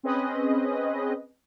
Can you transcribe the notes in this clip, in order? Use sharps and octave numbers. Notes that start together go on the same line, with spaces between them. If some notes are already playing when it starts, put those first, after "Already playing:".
C4 C#4 G#4 B4 D#5